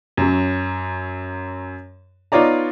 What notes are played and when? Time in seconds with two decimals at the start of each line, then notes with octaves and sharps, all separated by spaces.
0.17 F#2 F#3
2.32 B3 D#4 F4 C#5 D5 A#5